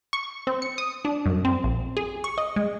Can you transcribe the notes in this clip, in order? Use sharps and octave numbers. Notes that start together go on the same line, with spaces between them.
C#6
C4
C#7
D#6
D4
F#2
C4
A#1
G#4
C#6
D#5
G#3